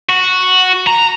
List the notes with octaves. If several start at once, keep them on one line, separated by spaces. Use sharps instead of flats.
F#4
A#5